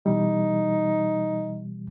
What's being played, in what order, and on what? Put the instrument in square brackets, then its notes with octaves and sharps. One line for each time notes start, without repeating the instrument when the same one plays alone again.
[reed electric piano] B2 E3 G3 [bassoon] D#4